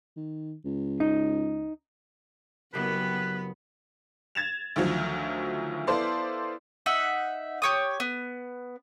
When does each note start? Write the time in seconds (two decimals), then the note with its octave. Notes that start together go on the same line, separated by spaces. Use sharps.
0.16 D#3
0.65 C#2
1.00 D#4
2.74 F#1 F#3 B3 G4 B4
4.35 G#6 A6 E7 F7
4.76 D2 D#3 F3 F#3
5.87 B3 E4 A4 C5 D5 F5
6.86 D#4 E5 F#5
7.62 G4 C#5 D#6
8.00 B3